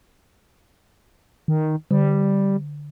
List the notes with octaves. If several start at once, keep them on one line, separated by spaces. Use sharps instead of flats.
D#3
D3 G3